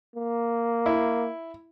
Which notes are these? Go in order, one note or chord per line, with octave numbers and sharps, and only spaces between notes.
A#3
E4